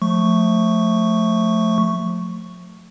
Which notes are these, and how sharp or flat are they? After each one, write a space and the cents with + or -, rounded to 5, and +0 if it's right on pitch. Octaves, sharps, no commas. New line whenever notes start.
F3 +30 A3 +0 C#6 +0